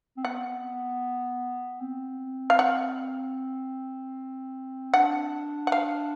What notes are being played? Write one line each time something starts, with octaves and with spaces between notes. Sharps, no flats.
C4
B3 F#5
C4
F5
F#5
D4 F#5
F#5
F5